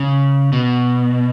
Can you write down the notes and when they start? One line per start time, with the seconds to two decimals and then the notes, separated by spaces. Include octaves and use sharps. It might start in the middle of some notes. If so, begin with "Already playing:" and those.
Already playing: C#3
0.53 B2